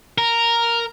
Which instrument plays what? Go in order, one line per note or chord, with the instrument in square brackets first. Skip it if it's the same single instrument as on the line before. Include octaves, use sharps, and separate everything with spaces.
[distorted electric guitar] A#4